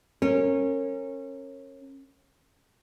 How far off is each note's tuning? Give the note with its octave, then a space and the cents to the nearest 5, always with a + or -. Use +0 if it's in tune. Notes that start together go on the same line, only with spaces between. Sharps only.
C#4 -25 A#4 -25